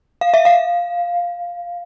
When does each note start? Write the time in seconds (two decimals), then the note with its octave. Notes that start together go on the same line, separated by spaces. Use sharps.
0.21 F5
0.34 E5
0.45 F5